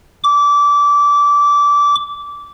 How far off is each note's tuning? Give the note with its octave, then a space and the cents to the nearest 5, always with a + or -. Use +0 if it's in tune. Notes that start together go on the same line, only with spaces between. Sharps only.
D6 -20